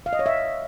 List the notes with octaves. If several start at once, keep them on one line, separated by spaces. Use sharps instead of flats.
F5
D#5
C#5
E5